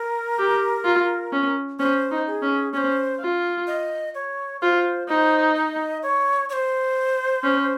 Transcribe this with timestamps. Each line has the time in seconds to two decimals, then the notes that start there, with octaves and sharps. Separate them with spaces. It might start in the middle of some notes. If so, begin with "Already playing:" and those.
Already playing: A#4
0.39 G4
0.85 F4
1.32 C#4
1.79 C#4 C5
2.11 D#4
2.27 G#4
2.42 C#4
2.73 C#4 C5 C#5
3.20 F4
3.67 D#5
4.15 C#5
4.61 F4 C5
5.08 D#4 C5
5.55 D#5
6.03 C#5
6.49 C#5
6.53 C5
7.44 C#4